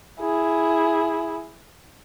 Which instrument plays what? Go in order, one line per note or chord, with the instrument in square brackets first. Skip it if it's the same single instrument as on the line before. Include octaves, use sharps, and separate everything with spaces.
[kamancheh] E4 G#4